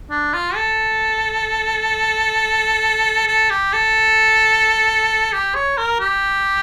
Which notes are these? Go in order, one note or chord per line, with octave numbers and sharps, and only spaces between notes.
D4
F4
A4
A4
G4
A4
G4
C#5
A#4
G4